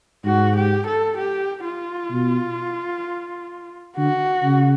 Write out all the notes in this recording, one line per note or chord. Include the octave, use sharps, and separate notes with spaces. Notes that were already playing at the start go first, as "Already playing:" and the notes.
G#2 F#4
G4
A4
G4
F4
B2
D3 F#4
C#3